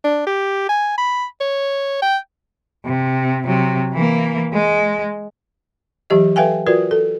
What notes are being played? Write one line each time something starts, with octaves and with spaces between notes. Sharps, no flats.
D4
G4
G#5
B5
C#5
G5
C3
C3 F#3
E3 A#3
G#3
E3 F#3 G4 D#5
A4 B4 E5 F5 G5 G#5
F4 F#4 A#4 B4 D5
A4